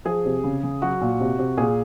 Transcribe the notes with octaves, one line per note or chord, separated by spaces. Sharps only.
F3 G#4
C3
C#3
C#3
F#3 F#4
A#2
C3
C3
A#2 G#4